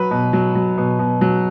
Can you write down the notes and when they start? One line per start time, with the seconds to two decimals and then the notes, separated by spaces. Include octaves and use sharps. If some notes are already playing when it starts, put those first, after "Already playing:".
Already playing: F#3 B4
0.11 B2
0.33 F#3
0.55 F#3
0.78 B2
0.99 B2
1.21 F#3